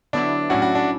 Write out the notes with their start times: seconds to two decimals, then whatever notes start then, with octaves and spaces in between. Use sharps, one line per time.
0.13 D3 F#3 B3 D4 E4
0.50 A2 F#3 C#4 E4 F#4
0.62 F#4
0.75 D4